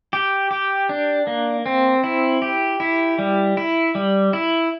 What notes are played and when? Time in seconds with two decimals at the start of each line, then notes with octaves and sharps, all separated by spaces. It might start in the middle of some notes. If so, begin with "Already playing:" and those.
0.13 G4
0.51 G4
0.89 D4
1.27 A#3
1.66 C4
2.04 E4
2.42 G4
2.80 E4
3.19 G3
3.57 E4
3.95 G3
4.33 E4